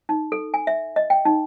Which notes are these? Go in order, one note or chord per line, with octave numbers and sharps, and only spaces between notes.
D#4
A4
G#5
E5
D#5
G5
D#4